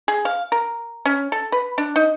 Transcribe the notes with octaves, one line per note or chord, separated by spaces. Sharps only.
G#4
F5
A#4
C#4
A4
B4
D4
D#4